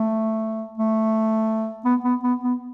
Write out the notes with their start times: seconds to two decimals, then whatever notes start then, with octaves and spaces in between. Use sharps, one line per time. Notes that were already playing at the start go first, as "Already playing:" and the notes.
Already playing: A3
0.78 A3
1.85 B3
2.04 B3
2.23 B3
2.44 B3